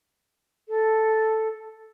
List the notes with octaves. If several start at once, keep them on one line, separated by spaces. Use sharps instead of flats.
A4